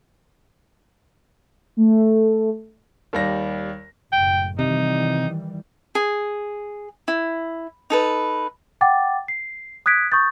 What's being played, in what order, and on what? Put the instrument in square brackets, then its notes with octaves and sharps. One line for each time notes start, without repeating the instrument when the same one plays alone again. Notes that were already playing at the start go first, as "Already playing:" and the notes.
[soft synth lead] A3
[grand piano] D#2 G3 A#6
[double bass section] F#1 A2 [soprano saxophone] G5
[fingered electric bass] C3 [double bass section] D#3 E3 G3 [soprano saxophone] D#4
[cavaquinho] G#4
E4
D#4 A4 B4
[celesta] F#5 G5 D6 A6
C7
D#6 F#6 G#6 B6 D7
C#6 D#6 G6 A6